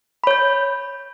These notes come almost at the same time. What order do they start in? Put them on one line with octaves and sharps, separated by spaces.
B5 C#5 G6